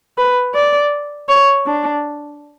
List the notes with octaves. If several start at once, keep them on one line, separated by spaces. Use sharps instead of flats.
B4
D5
C#5
D4